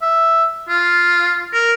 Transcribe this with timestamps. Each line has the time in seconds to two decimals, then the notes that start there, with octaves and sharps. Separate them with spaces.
0.02 E5
0.69 F4
1.53 A#4